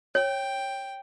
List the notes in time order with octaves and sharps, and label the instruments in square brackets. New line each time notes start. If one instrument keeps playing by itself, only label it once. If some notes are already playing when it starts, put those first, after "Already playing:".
[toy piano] C#5 [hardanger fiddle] G5